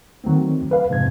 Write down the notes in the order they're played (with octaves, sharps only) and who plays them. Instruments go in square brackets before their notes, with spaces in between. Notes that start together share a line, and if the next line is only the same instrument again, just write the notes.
[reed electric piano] D#3 F#3 A3 C4
B4 F5
F2 G#2 C3 F3 G#6